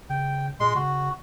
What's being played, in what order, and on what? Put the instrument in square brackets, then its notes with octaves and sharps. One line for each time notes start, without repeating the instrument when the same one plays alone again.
[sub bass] C#3 [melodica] G5
[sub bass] A#2 [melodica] G#3 C6
[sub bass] C#3 [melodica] F#4